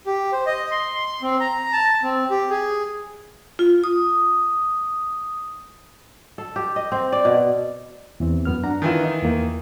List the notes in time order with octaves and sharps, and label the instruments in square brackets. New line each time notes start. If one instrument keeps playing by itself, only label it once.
[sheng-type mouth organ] G4
C5
D#5
C6
C6
C4
A#5
A5
C4
G4
G#4
[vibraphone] F4
D#6
[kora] A4
G4
D#5
C4
D5
B2
[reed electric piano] E2 E3 C4
F#2 B3 F6
D4 F#5 A#5
[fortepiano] D#3 E3 F4
[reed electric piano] D#4
E2 A#3